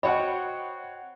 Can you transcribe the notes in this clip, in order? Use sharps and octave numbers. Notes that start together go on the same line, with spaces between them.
C4 F#4 C#5 D#5 F#5 B5